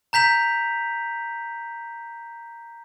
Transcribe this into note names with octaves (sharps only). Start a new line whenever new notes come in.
A#5 G6 B6 F7